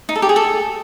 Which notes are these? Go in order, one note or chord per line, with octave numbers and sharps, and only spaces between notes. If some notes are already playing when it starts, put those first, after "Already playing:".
D#4
A4
G4
G#4
A4